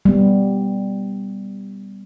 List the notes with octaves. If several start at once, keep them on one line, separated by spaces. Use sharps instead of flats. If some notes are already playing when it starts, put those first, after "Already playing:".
G3 B3